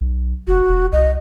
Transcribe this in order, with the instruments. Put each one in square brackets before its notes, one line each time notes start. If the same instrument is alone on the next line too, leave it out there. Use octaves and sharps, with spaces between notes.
[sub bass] B1
[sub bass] F1 [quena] F#4
[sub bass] E1
[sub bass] C2 [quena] D#5